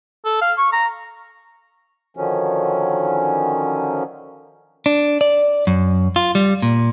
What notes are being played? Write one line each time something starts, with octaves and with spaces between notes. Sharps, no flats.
A4
F5
C#6
A#5
D3 D#3 F3 F#3 C#4
D4
D5
F#2
F4
G3
A#2